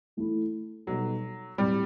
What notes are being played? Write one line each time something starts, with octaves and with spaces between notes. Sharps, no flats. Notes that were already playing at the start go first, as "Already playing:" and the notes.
E3 A3 E4
B2 F#3 G3 D#4 A4
A2 F#3 G3 C4